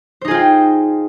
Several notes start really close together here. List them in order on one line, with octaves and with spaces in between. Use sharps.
C5 D#4 G#4 F4 G5